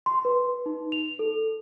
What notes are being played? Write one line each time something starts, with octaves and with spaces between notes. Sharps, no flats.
C6
B4
D#4
F7
A4